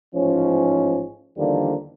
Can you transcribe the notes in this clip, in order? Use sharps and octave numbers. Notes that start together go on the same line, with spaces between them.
A1 G#2 F3 C#4
E2 D3 D#3 F3 G3 A#3